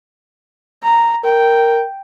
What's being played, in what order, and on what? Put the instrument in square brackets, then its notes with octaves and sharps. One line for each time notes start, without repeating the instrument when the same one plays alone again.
[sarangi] A#5
[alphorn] A#4 [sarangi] G5